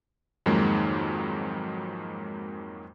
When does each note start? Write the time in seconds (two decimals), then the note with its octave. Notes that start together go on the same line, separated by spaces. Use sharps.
0.46 F2 G#2 D#3 F#3 G#3 A#3